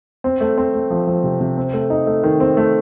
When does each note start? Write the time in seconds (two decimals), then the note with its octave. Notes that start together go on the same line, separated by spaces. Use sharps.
0.24 C4
0.41 A3
0.58 C4
0.74 A3
0.91 F3
1.07 F3
1.24 C3
1.40 C3
1.57 C4
1.73 A3
1.90 D#4
2.07 A3
2.23 D#3
2.40 C4
2.57 A3